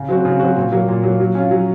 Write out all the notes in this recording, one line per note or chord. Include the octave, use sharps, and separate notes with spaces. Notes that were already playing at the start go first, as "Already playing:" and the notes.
Already playing: C#3
F#3 C4 F#4
C#3
F#3 C4 F#4
A#2
F#3 A#3
A#2
F#3 A#3
F#3
C#4 F4
F#3